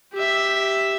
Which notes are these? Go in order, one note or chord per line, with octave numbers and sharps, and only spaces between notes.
G4 E5